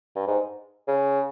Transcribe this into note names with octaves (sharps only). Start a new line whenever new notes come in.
G2
G#2
C#3